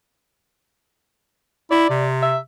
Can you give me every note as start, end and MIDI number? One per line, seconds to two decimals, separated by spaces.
1.71 1.87 64
1.71 2.06 74
1.90 2.38 48
2.23 2.38 76